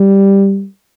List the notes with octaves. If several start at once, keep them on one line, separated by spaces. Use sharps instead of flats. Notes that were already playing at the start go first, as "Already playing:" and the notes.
Already playing: G3